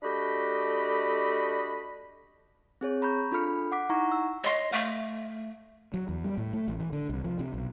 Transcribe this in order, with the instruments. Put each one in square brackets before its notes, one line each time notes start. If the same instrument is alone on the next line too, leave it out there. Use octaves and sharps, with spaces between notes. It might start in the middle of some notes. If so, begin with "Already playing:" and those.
[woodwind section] A3 D4 F#4 G4 D#5 B5
[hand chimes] C4 G#4 C#5
A#5 B5 C#6 G6
D4 F4 A4 B5 F6 C#7
F#5 D6 B6
D#4 E4 F#5 A#5 C#6
E6
[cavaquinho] C#5 C6 [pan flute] D#5
[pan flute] A3 [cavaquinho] F5
[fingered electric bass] F#3
E2
G3
A2
A3
A1
E3
D3
C2
F3
C3
B1